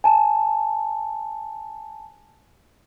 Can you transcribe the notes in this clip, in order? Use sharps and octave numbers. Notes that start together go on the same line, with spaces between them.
G#5 A5